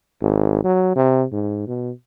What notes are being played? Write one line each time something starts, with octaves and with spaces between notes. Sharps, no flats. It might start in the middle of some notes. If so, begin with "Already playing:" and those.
G#1
F#3
C3
G#2
B2